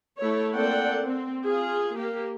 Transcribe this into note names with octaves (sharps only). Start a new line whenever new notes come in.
A3 E4 C#5
A#3 C4 A4 D5 F#5 G5
C4
F4 G#4
A#3 G4